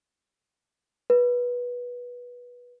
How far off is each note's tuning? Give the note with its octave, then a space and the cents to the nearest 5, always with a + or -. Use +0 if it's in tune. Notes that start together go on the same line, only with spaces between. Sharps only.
B4 -15